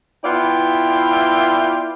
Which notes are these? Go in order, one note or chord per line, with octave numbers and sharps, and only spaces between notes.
B3 E4 F4 D5 G5